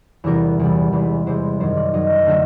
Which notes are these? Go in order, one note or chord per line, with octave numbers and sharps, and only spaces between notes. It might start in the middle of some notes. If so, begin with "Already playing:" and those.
E2 C3 E3 G3 A#4
E2 C3 E3 G3
E2 C3 E3 G#3 B4
E2 C3 E3 G#3 C5
F#2 D#3 F#3 C5
D5
F#2 D#3 F#3 D#5
D3 F#3 A3 E5